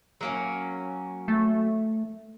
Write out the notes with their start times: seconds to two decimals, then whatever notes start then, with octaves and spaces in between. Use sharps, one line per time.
0.21 F#3 A#3 C#4
1.28 A3